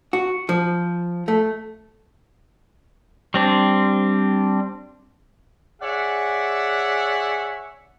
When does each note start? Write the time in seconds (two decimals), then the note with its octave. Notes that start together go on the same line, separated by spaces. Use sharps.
0.13 F#4
0.49 F3
1.28 A3
3.34 G3 C4 D4
5.82 G#4 C#5 D5 E5 F#5